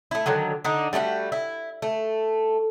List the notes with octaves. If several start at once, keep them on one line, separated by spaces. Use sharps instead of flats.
A3 E4
D3 D#3 F#3
D3 D4 D#4
G3 A3 D#4 F#4
E4
A3